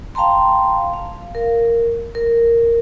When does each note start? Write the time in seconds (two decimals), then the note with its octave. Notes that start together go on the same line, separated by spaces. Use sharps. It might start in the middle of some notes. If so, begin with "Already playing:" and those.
0.15 F5 G5 A5 A#5 C6
0.93 F5
1.35 A#4
2.15 A#4